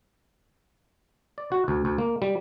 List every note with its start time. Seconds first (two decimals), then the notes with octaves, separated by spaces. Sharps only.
1.38 D5
1.52 F#4
1.68 D2
1.85 D2
1.98 A#3
2.22 G3